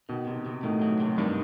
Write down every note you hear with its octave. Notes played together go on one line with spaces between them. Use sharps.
B2 D#3 B3
C3
C3
A2 D#3 A3
F#3
C3
G2 D#3 G3